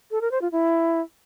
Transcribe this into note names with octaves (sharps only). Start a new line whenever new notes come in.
A4
A#4
C5
F4
E4